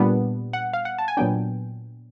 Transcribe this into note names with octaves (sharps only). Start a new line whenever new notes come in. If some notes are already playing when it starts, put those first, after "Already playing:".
Already playing: A#2 G3 B3 D4
F#5
F5
F#5
A5
G#5
A#2 F#3 B3 D4 G5